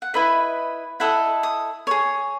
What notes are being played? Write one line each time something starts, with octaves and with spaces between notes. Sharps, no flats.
F#5
E4 B4 D#5 E5
E4 A4 D#5 F#5
D#6
G#4 C#5